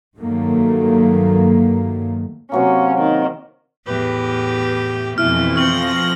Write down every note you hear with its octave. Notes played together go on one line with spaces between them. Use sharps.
G2 D#3 F#3 A3 A#3
C3 F#3 A#3 C#4
D#3
E2 A2 G4 B4
F2 B2 E3 A3 E4 F6
F3 C4 C#6 F6 A#6 F#7